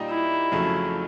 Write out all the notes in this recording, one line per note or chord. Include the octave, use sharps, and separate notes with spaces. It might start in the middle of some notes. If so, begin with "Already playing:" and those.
Already playing: A#2 G3 A#3 D#4 G4
E4
F2 C#3 F#3 A3